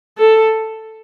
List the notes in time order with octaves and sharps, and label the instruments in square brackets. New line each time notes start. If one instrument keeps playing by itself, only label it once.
[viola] A4